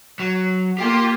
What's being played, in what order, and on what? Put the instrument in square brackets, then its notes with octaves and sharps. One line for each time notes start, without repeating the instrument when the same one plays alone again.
[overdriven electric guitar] F#3
[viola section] A#3 F4 [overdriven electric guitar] G4 G5